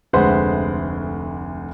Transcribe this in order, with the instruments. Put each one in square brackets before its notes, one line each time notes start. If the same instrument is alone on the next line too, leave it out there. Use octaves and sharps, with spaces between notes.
[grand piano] F1 D2 G#3 B4 C5 F#5